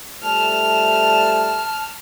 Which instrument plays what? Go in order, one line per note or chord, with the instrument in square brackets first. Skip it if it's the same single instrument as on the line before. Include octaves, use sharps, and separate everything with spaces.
[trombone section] F3 G3 A3 [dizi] A5 [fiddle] F6